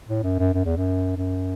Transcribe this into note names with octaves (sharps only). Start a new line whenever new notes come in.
A2
F#2
F#2
F#2
E2
F#2
F#2